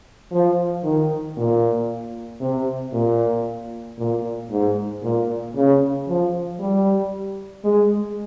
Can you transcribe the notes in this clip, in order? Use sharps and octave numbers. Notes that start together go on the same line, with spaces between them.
F3
D#3
A#2
C3
A#2
A#2
G#2
A#2
C#3
F3
G3
G#3